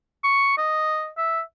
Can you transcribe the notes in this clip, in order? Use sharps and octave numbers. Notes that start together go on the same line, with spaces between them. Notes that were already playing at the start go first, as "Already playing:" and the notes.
C#6
D#5
E5